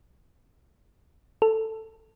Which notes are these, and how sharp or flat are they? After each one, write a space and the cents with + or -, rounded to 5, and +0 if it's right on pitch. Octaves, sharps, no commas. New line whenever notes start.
A4 +5